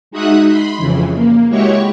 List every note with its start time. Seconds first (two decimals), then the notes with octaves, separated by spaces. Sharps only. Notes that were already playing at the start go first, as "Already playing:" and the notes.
0.11 G#3 D#4 F#4 E5 D#6 F#6
0.48 B5 C6
0.77 F2 C#3 E3
1.15 A#3
1.49 G#3 E4 F#4 G4 C#5 C#6